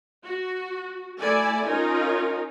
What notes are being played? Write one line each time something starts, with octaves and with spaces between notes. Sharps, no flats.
F#4
A3 E4 A4 D5 G#5
C#4 D#4 F4 A#4